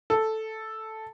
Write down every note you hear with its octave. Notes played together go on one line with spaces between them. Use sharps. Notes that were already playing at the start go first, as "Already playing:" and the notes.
A4